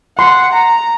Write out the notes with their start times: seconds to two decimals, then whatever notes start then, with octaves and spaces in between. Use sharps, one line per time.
0.19 F#5 C6
0.53 A#5